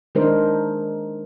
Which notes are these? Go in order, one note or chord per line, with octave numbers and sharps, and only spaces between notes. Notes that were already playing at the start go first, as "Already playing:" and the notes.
D#3 G#3 D4 D#4 A#4 C5